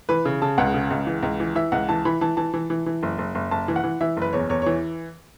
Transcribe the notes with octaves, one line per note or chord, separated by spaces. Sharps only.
E3 B4
C#3
C#3 A5
C#2 F#5
C#3
C#2
E3
C#2
E3
E3 E5
C#2 F#5
E3 A5
E3 B5
E3 A5
E3 A5
E3
E3
E3
F#1
F#1
F#1
F#1 A5
E3
F#5
E3
E3 E5
F#1 B4
E2 C#5
E2 C#5
E3 C#5